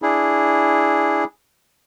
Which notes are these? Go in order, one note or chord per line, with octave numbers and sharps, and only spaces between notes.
D4 E4 G#4